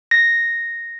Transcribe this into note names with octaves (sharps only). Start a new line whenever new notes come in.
A#6